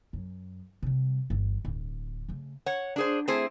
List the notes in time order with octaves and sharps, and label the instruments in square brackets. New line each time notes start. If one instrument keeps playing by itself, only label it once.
[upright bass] F#2
C3 G3
G1 E3
D1
C#3 A3
[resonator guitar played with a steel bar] C#5 F#5
D4 G#4 C5
A3 C4 E4 G#4 C5